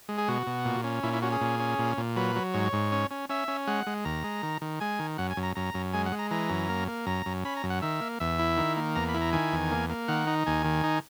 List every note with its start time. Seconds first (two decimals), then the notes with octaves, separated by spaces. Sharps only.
0.09 G#3
0.18 G#4
0.28 B2 F#4
0.47 B2
0.65 A#2
0.84 C#4
1.03 A#2 E4
1.13 E4
1.22 C#4 F#4
1.32 G#4
1.41 A#2
1.60 C#4
1.79 A#2
1.98 A#2
2.16 F#3 B4
2.36 F#3
2.54 G#2 C#5
2.73 G#2
2.92 C#4
3.11 C#4
3.29 C#4 E5
3.48 C#4
3.67 G#3 F#5
3.87 G#3
4.05 D#2 A#5
4.24 G#3
4.43 D#3
4.61 D#3
4.80 G#3 G#5
4.99 D#3
5.18 F#2 F#5
5.30 G#5
5.37 F#2
5.43 A#5
5.56 F#2 A#5
5.74 F#2
5.93 G#3 G#5
6.06 F#5
6.12 G#3
6.19 A#5
6.31 E3 A#5
6.50 F#2
6.69 A#3
6.88 A#3
7.06 F#2 A#5
7.26 F#2
7.45 C#4 B5
7.57 A#5
7.63 F#2
7.70 F#5
7.82 D#3 E5
8.01 A#3
8.20 E2 E5
8.39 E4
8.57 D#3
8.77 A#3
8.96 E2 A#5
9.09 B5
9.14 E4
9.21 A#5
9.33 D#3 G#5
9.52 E2
9.72 A#3
9.90 A#3
10.08 D#3 F#5
10.27 D#4
10.46 D#2 G#5
10.65 D#3
10.84 D#4